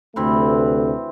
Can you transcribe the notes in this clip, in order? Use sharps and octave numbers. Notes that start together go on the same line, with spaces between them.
D2 C3 E3 A3 C4 B4